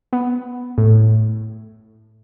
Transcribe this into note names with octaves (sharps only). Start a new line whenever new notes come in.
B3
A2